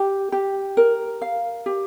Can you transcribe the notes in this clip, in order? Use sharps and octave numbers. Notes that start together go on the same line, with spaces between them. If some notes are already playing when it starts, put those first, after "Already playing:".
Already playing: G4
G4
A#4
F5
G4